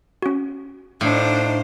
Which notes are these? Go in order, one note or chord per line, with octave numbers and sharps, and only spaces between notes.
C#4 F#4
A2 D4 D#4 C5 F5 G5